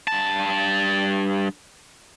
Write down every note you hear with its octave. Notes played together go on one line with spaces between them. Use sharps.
G2 A5